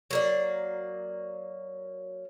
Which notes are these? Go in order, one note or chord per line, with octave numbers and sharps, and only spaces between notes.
F#3 A#3 D5